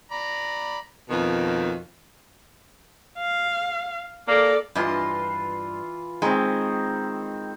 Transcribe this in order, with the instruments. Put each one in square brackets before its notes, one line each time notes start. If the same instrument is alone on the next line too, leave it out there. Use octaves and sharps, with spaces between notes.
[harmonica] D5 A#5 B5
[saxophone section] F2 B2 D#3
[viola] F5
[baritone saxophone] A#3 [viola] A4 D5
[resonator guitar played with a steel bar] G2 D#5 [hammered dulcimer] E3 F4 C6
[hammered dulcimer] D#3 C4 [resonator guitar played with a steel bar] G#3